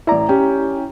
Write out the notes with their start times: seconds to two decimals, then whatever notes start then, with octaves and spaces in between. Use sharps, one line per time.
0.07 A1 E4 D5 A#5
0.29 C#4 G4 G5